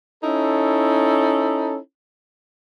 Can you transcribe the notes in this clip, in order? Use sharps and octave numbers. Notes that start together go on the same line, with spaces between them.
C#4 D#4 E4 A4